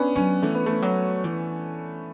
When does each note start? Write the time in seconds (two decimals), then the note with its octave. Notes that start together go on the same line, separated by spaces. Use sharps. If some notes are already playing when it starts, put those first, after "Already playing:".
Already playing: B3 C#4 D4
0.16 F#3 C#4
0.42 E3 A3
0.55 B3
0.66 A3
0.82 F#3
1.24 E3